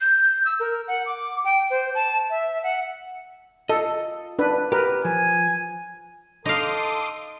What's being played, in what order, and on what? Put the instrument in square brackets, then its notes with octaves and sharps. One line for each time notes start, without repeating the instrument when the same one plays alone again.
[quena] G6
E6
A#4
F#5
D6
G5
C5
A5
E5
F#5
[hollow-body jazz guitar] F4 D#5 [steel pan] A4
[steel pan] D4 B4
[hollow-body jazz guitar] G4 [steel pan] A#4 B4
[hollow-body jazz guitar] F3 [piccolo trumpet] G#5
[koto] D#4 F5 [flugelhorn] A4 [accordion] C6 D6 D#6